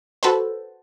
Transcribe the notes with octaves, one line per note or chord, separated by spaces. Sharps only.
F#4 A4 B4 C5